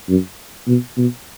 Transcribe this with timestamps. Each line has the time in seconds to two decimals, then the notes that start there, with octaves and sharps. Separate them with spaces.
0.09 F#2
0.68 B2
0.97 B2